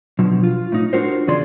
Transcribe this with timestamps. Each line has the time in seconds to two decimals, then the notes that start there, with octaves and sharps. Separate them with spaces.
0.19 B2 D3 F3 F#3
0.44 F4
0.72 A2 D#4
0.93 D4 F4 F#4 A#4 C5
1.27 E2 C#3 G#4 D5 C6